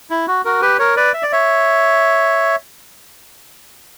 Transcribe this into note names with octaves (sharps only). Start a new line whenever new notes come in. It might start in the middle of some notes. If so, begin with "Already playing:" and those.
E4
F#4
F#4 A#4
G4 B4
A#4 C#5
B4 D5
E5
D5
C#5 E5